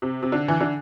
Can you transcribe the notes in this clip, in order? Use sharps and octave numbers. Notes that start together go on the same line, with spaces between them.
C3
C3
D3
E3
D3